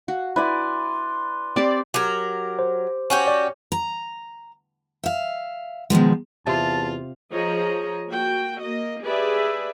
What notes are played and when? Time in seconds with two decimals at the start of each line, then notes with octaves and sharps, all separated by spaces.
0.08 F#4 F5
0.36 E4 B4 D5 G#5 C6
1.56 C4 G4 C5 D5
1.94 F#3 G4 A#4
2.59 C5
3.10 C#4 F#4 G4 C#5
3.28 D5
3.72 A#5
5.03 E5 F5
5.90 B2 D#3 F3 G#3
6.47 E2 C3 F4 A5
7.31 F3 G#4 C#5 D#5 A#5
8.08 A#3 F#4 G5
8.60 A#3 D#5
9.03 G4 G#4 B4 D5 E5